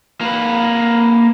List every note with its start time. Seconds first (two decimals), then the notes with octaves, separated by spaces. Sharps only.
0.20 A#3 B4